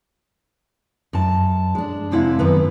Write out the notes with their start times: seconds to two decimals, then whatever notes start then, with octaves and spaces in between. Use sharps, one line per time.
1.13 F#2 A5
1.75 G#3 D4
2.11 F2 C3 G#3 E4 F5 F#5
2.39 F#2 D#3 B3 B4